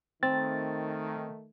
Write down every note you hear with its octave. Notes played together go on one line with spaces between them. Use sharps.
D#3 A3 C4 A6